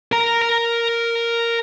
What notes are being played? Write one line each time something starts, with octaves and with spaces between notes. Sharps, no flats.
A#4 A#5